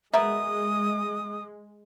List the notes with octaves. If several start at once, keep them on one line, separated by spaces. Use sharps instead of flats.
B2 G#3 A#4 B4 E5 D#6